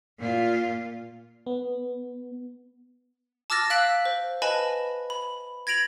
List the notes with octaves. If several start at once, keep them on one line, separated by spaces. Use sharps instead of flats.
A#2 F4
B3
A5 D6 E6 F6 A6 A#6
F5 E6 F#6 B6 D7 F#7
C5
B4 D#5 G#5 A5 B5
B5
G#6 A#6 D7 F7 F#7